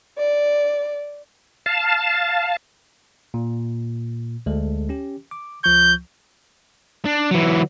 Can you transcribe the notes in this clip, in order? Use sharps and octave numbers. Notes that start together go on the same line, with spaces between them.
D5
F5 A5
A#2
D2 G#3 A4
C#4 G4
D6
C#2 F3 C#6 G6
D4
E3 F#3